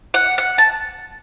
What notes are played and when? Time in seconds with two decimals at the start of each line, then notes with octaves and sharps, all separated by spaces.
0.14 F#5
0.38 F#5
0.58 A5